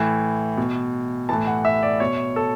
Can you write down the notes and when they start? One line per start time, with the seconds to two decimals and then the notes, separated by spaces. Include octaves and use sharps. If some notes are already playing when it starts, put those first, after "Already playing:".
Already playing: A2 E3
0.57 B2
1.29 A2 E3 A5
1.47 F#5
1.65 E5
1.83 D5
2.00 B2 C#5
2.36 A4